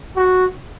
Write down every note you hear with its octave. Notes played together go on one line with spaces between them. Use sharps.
F#4